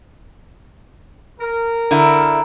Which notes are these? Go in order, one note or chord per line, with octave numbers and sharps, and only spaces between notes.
A#4
D3 E4 A#5